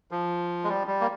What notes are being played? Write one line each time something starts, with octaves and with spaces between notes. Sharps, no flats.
F3
G#3
G3
G3
A#3